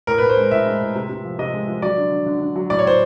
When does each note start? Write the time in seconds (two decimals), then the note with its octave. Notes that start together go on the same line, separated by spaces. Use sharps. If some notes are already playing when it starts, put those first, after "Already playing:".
0.07 A2 A#4
0.18 A2 B4
0.29 C5
0.37 G#3
0.51 A2 E5
0.66 G#3
0.81 A2
0.95 C3
1.09 C3
1.24 F3
1.39 C3 D#5
1.54 G#3
1.68 F3
1.82 F#3 D5
1.97 D3
2.12 D3
2.26 D3
2.41 D3
2.56 F#3
2.70 A2 D5
2.79 C#5
2.85 A2 C5